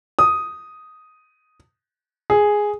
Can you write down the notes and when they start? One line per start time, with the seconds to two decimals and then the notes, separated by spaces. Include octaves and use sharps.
0.19 D#6
2.30 G#4